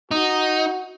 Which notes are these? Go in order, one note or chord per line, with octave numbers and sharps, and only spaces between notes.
D#4 F#4